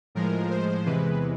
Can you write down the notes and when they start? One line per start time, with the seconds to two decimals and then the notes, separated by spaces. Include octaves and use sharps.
0.15 A2 F3 G#3 A#4
0.51 C5
0.86 E2 C3 E3 G#3 B4